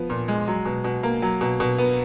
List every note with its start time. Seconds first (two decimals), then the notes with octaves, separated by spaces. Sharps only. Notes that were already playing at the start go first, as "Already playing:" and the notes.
Already playing: F3 B3
0.10 A#2
0.28 G#3
0.48 F#3
0.65 B2
0.84 B2
1.03 A#3
1.22 F#3
1.41 B2
1.60 B2
1.78 B3